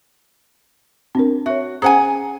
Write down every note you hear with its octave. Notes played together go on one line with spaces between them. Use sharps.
C4 D4 A#4
F#4 C#5 E5
C#4 G#4 C5 F#5 G#5 A#5